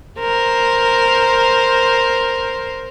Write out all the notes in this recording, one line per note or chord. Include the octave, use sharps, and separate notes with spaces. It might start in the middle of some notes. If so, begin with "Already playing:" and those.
A#4 C5